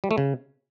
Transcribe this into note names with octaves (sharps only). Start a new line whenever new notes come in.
G3
A3
C#3